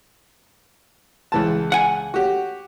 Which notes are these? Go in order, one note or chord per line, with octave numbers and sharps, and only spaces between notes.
C#2 E3 A5
F#5 G#5
F#4 G4